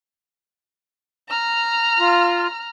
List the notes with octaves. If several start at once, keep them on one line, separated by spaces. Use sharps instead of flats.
A#5 F6
F4